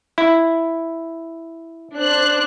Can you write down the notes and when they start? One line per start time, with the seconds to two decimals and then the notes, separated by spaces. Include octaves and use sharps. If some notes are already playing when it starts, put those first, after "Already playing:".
0.18 E4
1.98 D4 C5 F#6